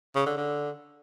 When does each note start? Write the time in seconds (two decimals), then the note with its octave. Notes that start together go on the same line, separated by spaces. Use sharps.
0.15 C#3
0.26 D3
0.37 D3